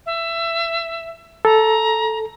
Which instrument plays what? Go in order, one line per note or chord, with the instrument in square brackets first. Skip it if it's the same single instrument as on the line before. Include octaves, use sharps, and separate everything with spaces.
[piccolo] E5
[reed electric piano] A4 [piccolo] A#5